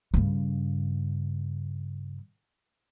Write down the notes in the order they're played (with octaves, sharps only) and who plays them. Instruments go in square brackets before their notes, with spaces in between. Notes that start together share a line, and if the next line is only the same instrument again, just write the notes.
[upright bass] G2 C#3